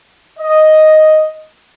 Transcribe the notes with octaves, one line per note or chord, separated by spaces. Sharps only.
D#5